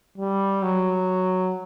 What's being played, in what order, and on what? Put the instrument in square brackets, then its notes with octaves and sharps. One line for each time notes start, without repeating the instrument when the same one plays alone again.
[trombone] G3
F#3